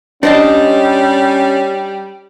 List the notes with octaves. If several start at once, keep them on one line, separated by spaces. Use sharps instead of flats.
G3 C#4 D4 C5 D#5 A5